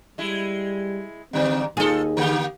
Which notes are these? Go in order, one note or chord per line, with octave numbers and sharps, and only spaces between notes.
G3 G#3 E4
G#2 D3 G3 C4
D#2 D#4 F4 G#4 A4
D3 A#3 G4